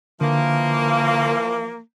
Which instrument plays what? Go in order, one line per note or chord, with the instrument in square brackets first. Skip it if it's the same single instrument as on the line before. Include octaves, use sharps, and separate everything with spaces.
[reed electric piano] D3 [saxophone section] E3 F3 A#3